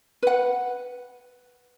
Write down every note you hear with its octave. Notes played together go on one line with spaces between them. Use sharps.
B4 F#5